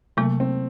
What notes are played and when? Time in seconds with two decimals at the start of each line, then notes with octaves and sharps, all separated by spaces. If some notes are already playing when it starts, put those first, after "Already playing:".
0.17 C3 F#3 A3 A#3
0.40 C4